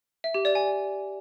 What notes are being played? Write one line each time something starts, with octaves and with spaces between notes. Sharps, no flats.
E5
G4
D5
G#5